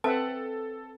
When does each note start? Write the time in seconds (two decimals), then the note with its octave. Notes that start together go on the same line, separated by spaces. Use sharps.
0.04 C4 A4 B4 E5 F#5 A5